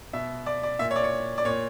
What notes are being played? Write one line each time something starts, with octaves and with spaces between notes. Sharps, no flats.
B2 E5
D5
D5
A#2 E5
C#5
D5
C#5
D5
A#2 C#5